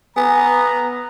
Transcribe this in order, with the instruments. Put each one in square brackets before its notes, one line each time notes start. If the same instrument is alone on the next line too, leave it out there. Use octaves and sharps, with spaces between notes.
[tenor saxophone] B3 [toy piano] G#5 [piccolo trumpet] A#5